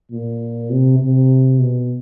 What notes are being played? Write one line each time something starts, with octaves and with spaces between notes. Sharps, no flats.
A#2
C3
C3
B2